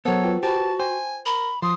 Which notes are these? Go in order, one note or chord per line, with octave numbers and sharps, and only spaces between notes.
F#3 B3 A4 A#4 C5 C#5 F#5
F4 B4 G5
F#4 G4 B4 C5 A5
C5 G5 G#5
A#4 B5
F3 C6 D#6